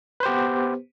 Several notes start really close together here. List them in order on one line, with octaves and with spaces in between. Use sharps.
B4 C5 G4 B3